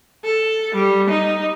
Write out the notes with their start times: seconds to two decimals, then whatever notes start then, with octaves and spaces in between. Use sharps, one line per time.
0.24 A4
0.75 G3
1.10 D#4